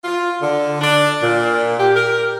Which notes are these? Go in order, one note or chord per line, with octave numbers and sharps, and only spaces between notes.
F4
D3
D4
A#2
G4
A#4